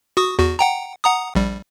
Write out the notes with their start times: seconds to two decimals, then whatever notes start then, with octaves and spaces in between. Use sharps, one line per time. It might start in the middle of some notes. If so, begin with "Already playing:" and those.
0.17 F#4 C#6 D#6
0.39 E2 F#4
0.59 F#5 G5 A#5
1.04 F#5 A#5 D#6
1.35 A#1 G3